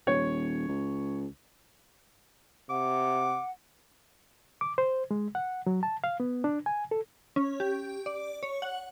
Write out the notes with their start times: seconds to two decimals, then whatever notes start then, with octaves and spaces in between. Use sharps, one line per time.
0.07 D#1 C#5
0.68 C#2
2.70 C3 F#5 D6
4.61 D6
4.78 C5
5.11 G#3
5.35 F#5
5.67 F#3
5.83 A5
6.04 F5
6.20 B3
6.44 D4
6.66 G#5
6.91 A4
7.36 C#4
7.60 G4
8.06 D5
8.43 C#5
8.62 F#5